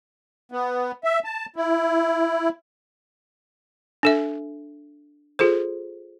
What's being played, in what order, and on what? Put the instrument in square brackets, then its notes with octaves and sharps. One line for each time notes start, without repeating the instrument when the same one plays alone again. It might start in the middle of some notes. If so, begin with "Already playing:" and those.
[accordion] B3
E5
A5
E4
[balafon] D4 A4 E5
F4 G#4 A4 C5